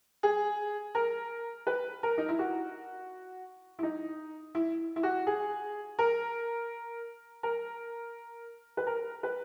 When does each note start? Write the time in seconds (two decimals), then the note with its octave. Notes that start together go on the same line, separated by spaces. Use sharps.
0.23 G#4
0.95 A#4
1.67 B4
2.03 A#4
2.18 D#4
2.29 E4
2.39 F#4
3.79 E4
3.83 D#4
4.55 E4
4.96 E4
5.03 F#4
5.27 G#4
5.99 A#4
7.43 A#4
8.77 B4
8.87 A#4
9.23 B4